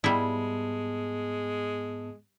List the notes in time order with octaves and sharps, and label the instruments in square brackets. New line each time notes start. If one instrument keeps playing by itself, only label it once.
[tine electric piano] G#2 B3 A5 [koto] G3 E4 [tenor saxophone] G#3